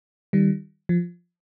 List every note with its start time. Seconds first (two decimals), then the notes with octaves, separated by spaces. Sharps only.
0.33 D#3 G3
0.89 F3